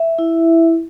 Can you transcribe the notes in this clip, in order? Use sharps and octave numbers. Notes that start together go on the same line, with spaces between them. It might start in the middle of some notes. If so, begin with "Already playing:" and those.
Already playing: E5
E4